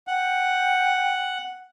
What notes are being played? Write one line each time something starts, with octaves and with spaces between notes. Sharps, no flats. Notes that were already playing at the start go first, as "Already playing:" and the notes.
F#5 G5